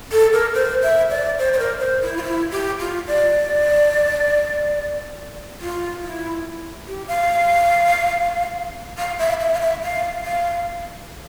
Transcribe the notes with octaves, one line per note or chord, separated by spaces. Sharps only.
A4
A#4
C5
E5
D5
C5
C5
A#4
C5
E4
F4
E4
G4
F4
D5
F4
E4
G4
F5
F5
E5
E5
F5
E5
F5
F5